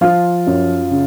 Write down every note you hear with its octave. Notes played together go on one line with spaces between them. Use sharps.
F3 F4
F#2
C#3